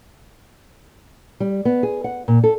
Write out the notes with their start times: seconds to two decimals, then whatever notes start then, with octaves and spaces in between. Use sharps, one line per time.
1.40 G3
1.65 B3
1.83 G#4
2.04 F#5
2.28 A#2
2.44 A4